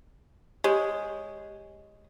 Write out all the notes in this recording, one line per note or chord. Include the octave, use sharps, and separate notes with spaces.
G#3 G4 C#5